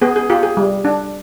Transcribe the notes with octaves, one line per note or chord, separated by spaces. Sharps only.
B3 G#4
G#4
F4 G4
G#4
G3
D4